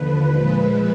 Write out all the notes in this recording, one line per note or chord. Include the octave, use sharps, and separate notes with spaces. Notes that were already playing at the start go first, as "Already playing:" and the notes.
Already playing: D#2 D3 F3 B4
A#2 F3 G#3 B4